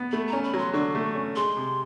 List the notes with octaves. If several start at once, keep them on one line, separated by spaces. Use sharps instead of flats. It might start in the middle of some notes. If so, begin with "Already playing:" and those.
Already playing: B3
A3 B5
A#5
C#4
B5
F#3
C6
D3 C#6
A3
C#4
G#3 C6
C3